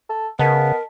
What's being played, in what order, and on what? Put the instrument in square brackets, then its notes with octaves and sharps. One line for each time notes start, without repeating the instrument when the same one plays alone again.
[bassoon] A4
[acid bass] C#3 [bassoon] B3 [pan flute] A#4 [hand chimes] D#5 A5 B6